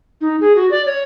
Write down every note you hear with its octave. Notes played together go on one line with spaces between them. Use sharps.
D#4
G#4
F#4
D5
C#5